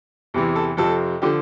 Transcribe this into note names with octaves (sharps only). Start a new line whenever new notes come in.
E2 C3 E3
A4
F2 C3 F3 A4
D3 F3 G4